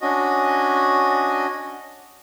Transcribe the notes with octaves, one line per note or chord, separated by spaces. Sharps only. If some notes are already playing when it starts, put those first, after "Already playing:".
C#4 D4 F#4 D#5